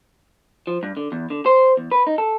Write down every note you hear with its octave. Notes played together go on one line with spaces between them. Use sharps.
F3
G2
D3
E2
D3
C5
E2
B4
D#4
A4